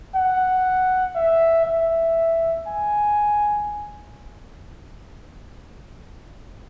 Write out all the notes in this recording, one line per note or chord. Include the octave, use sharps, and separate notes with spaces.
F#5
E5
E5
G#5